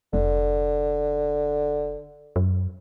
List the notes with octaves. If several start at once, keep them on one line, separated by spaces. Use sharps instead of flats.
F1 D3
F#2